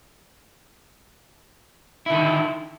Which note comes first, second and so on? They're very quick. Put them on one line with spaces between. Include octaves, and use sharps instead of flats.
E4 D3 D#3